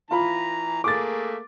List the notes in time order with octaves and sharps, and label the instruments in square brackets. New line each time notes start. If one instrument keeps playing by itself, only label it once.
[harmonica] E3 A#5 [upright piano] F4 B5
[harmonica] A3 A#3 G#4 [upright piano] D6 A6